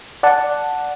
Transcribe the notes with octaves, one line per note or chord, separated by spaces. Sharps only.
D5 F#5 A5